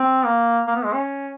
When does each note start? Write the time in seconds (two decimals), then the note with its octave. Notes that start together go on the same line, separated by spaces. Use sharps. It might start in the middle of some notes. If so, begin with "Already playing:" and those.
Already playing: C4
0.25 A#3
0.67 A#3
0.76 B3
0.85 G#3
0.93 C#4